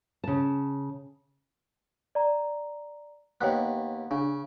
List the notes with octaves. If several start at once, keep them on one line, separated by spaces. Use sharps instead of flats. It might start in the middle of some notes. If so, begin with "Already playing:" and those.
C#3 A5
D5 A#5
D#2 B3 C#5 G5 F#6
C#3 D4